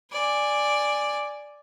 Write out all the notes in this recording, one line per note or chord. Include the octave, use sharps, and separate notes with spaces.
D5 G#5